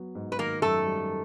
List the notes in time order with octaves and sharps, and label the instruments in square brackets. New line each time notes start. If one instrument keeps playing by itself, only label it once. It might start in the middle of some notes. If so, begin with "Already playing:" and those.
Already playing: [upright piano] F#3 B3
G#2
[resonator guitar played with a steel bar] B4
[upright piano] D#3 [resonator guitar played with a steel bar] A#3 A#4
[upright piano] F#2 [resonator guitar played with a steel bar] A3 A4
[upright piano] G3